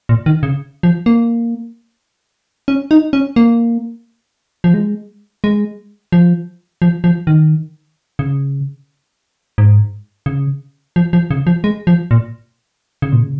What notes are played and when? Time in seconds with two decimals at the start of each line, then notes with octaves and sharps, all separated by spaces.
0.09 A#2
0.26 D#3
0.43 C#3
0.83 F3
1.06 A#3
2.68 C#4
2.91 D#4
3.13 C#4
3.36 A#3
4.64 F3
4.74 G#3
5.44 G#3
6.12 F3
6.82 F3
7.04 F3
7.27 D#3
8.19 C#3
9.58 G#2
10.26 C#3
10.96 F3
11.13 F3
11.31 C#3
11.47 F3
11.64 G#3
11.87 F3
12.11 A#2
13.02 C#3
13.12 A#2
13.23 C#3